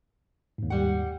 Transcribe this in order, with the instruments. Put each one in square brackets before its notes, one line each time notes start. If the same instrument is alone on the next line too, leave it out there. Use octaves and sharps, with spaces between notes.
[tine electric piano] D#2 G#2
[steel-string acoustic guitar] G3 F#5